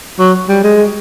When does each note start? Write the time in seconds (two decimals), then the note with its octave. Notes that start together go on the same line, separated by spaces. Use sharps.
0.19 F#3
0.49 G3
0.64 G#3